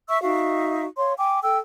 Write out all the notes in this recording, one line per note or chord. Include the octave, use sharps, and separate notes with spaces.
E5 C#6 E6
D#4 F#4 E5 F5
C#5 F5 C6
G5 G#5 D6
A4 G5 E6